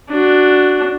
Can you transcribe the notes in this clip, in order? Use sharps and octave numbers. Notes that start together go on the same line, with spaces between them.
D4 F#4